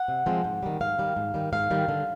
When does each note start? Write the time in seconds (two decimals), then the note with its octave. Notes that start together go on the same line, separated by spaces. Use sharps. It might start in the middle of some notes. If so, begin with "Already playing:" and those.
Already playing: F#5
0.08 C3
0.26 F3 G#3 C4
0.44 G#2
0.63 D#3 G3
0.80 G#2 F5
0.98 D#3 G3
1.16 G#2
1.34 D#3 G3
1.52 G#2 F5
1.71 D#3 G3
1.88 D3